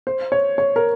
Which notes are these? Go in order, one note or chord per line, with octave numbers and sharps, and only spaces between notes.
C5
C#5
C#5
A#4